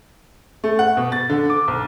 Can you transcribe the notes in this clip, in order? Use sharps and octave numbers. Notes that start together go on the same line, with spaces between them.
A3
F#5
B2
A6
D3
D6
B1